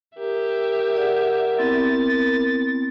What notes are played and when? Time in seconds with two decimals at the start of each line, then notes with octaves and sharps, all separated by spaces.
0.18 G4 A#4 E5
0.96 G#4 D5 F#5
1.59 B3 C4 E4 A6